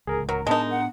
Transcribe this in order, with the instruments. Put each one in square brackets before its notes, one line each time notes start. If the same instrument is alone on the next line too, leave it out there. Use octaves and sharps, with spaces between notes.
[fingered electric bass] D1 C#2 [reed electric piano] G#4 A#4
[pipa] F#3 [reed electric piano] A#4
[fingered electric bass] A2 B3 D4 [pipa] G#3 D#4 [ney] A5
[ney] F#5